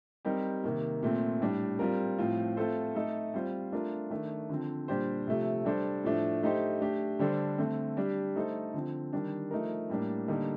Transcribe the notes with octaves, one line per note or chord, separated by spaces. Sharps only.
G3 C4 D#4 G4 A#4
C3 D#3 A#3
A#2 A3 C4
A2 G3 D4
G3 C4 F4 A#4
A2 F3 C4 F4
A3 C4 F4 A4 C5
A3 D#4 A4
G3 C4 F4 C5
A3 D4 F4 A#4
D#3 A3 D4
D3 F3 C4
A#2 G3 D4 G4 C5
C3 F3 A3
G3 D4 A4 C5
A2 F3 A3 D4
A3 D#4 G4 C5
A3 D4 G4
D3 G3 D4 A4 C5
D3 A3 C4
G3 D4 G4
A3 D#4 A4 C5
D3 F3 C4
D#3 G3 D4
F3 A3 D#4 A#4
A2 G3 A#3 D4
D3 G3 A#3 D#4 A#4